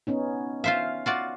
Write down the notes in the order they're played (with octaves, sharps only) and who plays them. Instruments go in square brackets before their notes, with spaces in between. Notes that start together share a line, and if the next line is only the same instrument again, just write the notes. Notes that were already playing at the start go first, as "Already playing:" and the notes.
[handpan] B3 C#4 D#4
[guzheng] F4 C5 E5 [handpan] F5
[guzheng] F4 F#4 D5